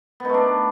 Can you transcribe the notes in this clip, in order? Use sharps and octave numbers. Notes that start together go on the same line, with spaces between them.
A3 B3 D4 D#4